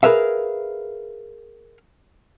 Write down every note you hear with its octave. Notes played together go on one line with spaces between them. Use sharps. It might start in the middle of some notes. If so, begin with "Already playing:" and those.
G#4 A#4 B4 E5 F5